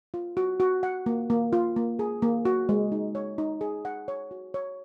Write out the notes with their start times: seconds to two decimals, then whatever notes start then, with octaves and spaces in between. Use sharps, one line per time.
0.14 F4
0.37 F#4
0.60 F#4
0.83 F#5
1.06 A#3
1.30 A#3
1.53 F4
1.76 A#3
1.99 G#4
2.22 A#3
2.45 F#4
2.69 G#3
2.92 D#4
3.15 C#5
3.38 D#4
3.61 G#4
3.85 F#5
4.08 C#5
4.31 F#4
4.54 C#5